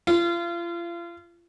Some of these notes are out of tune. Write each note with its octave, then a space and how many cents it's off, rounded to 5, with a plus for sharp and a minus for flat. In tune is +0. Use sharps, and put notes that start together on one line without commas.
F4 -35